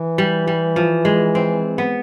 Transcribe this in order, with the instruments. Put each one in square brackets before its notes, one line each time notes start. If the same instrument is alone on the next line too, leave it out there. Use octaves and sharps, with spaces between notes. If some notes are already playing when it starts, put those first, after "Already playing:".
Already playing: [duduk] E3
[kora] G3
G3
F3
G#3
C4
B3